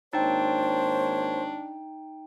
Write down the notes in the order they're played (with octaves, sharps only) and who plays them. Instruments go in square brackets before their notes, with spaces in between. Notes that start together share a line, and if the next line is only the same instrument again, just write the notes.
[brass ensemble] G#1 A#3 C#5 [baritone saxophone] D4 [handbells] D#4 G5 [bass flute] C5